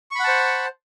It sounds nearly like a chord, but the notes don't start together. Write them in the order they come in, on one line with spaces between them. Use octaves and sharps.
C#6 B5 F#5 A5 C5